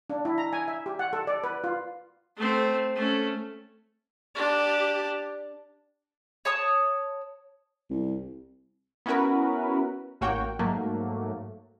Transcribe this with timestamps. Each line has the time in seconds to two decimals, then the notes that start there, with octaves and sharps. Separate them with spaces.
0.10 D4
0.25 E4
0.38 A#5
0.53 G#5
0.68 E5
0.86 G4
0.99 F#5
1.13 A4
1.27 D5
1.44 B4
1.64 F4
2.37 A3 C4
2.95 A3 C#4
4.35 D4 G4
6.45 C#5 A5 D#6
7.90 C2
9.06 B3 C#4 E4 F#4 A#4 B4
10.21 A1 A#3 F#4 C#5 G5
10.59 G#2 F#3 A3 A#3